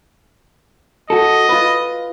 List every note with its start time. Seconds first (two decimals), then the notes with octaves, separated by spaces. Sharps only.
1.10 F#4 A4 D#5
1.49 F4 B4